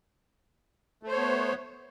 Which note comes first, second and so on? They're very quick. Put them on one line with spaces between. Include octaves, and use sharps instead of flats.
A3 C5 C#5 B3